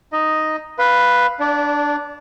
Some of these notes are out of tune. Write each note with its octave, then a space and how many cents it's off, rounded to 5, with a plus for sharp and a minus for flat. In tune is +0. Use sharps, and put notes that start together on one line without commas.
D#4 +0 D#5 +0
B4 +0 F5 +0 B5 +45
D4 +0 D5 -30